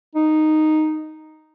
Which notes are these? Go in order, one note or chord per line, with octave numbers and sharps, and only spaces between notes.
D#4